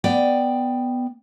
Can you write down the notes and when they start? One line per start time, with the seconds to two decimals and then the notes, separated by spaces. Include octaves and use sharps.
0.04 B3 D5 G5